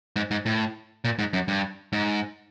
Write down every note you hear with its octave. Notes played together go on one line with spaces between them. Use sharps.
G#2
G#2
A2
A#2
G#2
F#2
G2
G#2